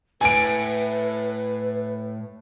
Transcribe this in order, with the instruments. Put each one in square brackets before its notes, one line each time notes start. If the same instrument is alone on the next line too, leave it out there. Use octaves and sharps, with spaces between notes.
[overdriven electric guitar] A2 [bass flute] B4 [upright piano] G#5 D7